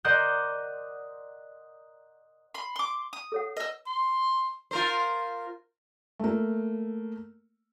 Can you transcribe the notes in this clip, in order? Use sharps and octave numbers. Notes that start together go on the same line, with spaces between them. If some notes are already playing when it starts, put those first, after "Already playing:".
A#4 C5 D5 D#5 F#5 G6
B5 C6
C6 D6
D#6
A4 C#5 F#5
B4 D#5 E6
C6
F4 A#4 C5
A3 A#3